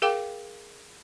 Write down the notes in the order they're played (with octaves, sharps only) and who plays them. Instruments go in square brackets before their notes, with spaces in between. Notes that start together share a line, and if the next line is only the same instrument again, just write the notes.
[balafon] G#4 A#4 F5 G5 D6